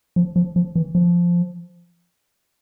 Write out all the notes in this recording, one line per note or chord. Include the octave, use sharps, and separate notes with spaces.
F3
F3
F3
E3
F3